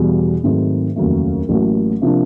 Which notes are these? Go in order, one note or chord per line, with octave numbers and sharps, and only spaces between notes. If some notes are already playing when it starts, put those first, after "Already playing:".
Already playing: E2 B2 G3
G#2 D#3 F#3 A3 C4
F1 D#2 C#3 F#3 A3
A1 A2 F#3 A#3
C3 F3 A#3 D4